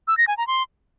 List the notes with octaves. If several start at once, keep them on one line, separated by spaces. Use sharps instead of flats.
E6
A#6
G#5
A#5
C6